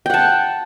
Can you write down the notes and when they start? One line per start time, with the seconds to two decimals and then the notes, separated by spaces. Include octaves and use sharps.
0.06 G5
0.10 F#5
0.14 A5